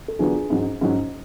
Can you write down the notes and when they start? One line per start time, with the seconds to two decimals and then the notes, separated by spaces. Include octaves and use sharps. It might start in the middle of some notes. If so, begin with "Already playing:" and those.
0.08 A4
0.19 D3 F#3 B3 D4 F4 G#4
0.50 G#2 F#3 C#4
0.81 G#2 F#3 C#4